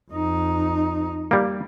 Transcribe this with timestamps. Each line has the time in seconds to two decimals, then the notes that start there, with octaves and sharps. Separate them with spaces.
0.11 F2 D#4
1.31 G3 A#3